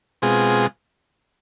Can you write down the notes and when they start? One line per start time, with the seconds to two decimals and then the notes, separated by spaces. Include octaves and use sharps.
0.22 B2 G#3 C4 F4 G#4